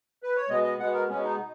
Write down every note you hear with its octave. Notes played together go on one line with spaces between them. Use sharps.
B4
C#5
B2 G#3 B3 D#5
D#5
B2 G#3 B3 F#5
A#4
B2 G#3 B3 C#4
D#4
B2